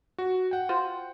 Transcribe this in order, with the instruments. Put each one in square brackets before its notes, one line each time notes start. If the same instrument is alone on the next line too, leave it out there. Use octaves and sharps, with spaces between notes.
[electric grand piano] F#4
F#5 G5
[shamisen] F4 F#4 C5